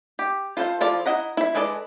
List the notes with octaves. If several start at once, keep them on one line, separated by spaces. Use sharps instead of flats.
G4
F4 A4 A#4 C5 F5
F3 E4 F4 A4 D5
E4 D#5 F#5 A#5
E4 E5
G#3 G#4 A4 B4 D5